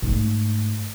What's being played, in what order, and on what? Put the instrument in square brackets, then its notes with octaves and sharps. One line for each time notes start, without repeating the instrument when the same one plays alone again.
[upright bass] G#2 A3